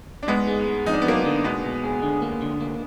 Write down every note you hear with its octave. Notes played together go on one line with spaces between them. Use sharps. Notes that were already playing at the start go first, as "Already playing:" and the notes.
D4
G#2 G#3 B3
G#3
G#2
F2 D#4
D4
B3
F#3 A#3 D4
D3
B2 G#3 B3
B2
G#4
D3
A#3
D3
A#3